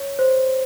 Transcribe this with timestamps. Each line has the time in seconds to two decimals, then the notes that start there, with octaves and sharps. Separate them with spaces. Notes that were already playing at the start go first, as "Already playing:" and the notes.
Already playing: C#5
0.19 C5